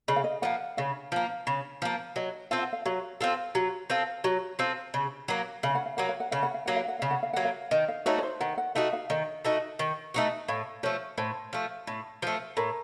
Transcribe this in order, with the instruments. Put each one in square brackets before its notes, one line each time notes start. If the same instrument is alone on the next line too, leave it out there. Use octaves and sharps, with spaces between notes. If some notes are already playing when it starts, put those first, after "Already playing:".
[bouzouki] C#3 [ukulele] D#5
[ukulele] F5
D#5
[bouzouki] F3 A#3 [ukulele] F#5
[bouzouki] C#3 [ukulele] F5
[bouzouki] F3 A#3
C#3
F3 A#3
[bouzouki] F#3 [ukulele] D#5
[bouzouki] C4 F4 A4 [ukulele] F5
[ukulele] F#5
F5
[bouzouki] F#3 [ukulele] F5
[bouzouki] C4 F4 A4
F#3
C4 F4 A4
F#3
C4 F4 A4
C#3
F#3 A#3
[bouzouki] C#3 [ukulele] F5
[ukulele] F#5
F5
[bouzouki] F#3 A#3 [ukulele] F#5
[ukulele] F5
F#5
[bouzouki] C#3 [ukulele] F5
[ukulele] F#5
F5
[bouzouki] F#3 A#3 [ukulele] F#5
[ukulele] F5
F#5
[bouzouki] C#3 [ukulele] F5
[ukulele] F#5
F5
[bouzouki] F#3 A#3 [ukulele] F#5
[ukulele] F5
[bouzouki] D#3 [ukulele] D#5
[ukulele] F5
[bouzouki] A3 D#4 F#4 [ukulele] C#5
[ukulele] C#5
C5
[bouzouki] D#3 [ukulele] F#5
[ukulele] F#5
[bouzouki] A3 D#4 F#4 [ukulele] F5
[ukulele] F5
[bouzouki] D#3 [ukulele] D#5
[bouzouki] A3 D#4 F#4
D#3
A3 D#4 F#4
[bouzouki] A2 [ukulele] F5
[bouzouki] F3 A3 [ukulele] C#5
[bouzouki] A2 [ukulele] C5
[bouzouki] F3 A3
A2
F3 A3
[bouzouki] A2 [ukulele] A#4